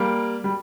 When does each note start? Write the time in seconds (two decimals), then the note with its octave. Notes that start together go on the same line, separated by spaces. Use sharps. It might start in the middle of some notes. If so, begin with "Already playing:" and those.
Already playing: G3 A#3
0.44 G3